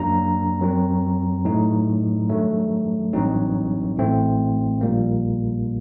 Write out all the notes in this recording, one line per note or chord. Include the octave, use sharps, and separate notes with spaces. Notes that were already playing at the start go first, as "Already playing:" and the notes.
Already playing: F#2 F#3 A#3 D4 A#5
F#2 F#3 C4
A2 F#3 A3 D#4
G2 D#3 F#3 A3
A1 G2 F#3 C4 D#4
A1 A2 A3 C4
A#1 A#2 G3 A#3